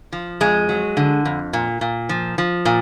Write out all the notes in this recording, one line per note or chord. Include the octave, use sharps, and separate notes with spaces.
F3
F2 G#3
F#3
D3
F2
A#2
A#2
F3
F3
A#2